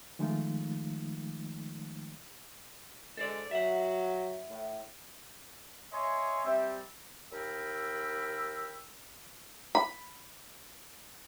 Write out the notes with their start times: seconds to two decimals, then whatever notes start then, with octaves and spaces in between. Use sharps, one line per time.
0.19 D#3 F3 G#3 A3 D#4 F4
3.17 G#3 A4 C5 D5
3.51 F#3 E5 F#5
4.48 A2
5.93 C#5 D#5 E5 G#5 C6
6.45 G3 C4 E5
7.31 D#2 A#4 G5 B5 E6
9.75 B5